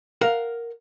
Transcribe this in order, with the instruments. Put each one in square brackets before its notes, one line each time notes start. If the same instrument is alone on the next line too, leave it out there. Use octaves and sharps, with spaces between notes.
[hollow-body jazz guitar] A#4 F5 F#5